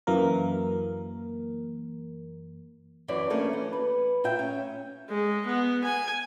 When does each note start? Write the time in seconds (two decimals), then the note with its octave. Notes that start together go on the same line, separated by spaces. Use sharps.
0.07 F#2 E3 A#3 A#4
3.08 F#2 E3 B4 D5
3.30 A3 A#3 C#4 D4
3.53 E3
3.73 B4
4.24 A#2 F4 E5 G5
4.39 C#4
5.09 G#3
5.46 B3
5.84 G#5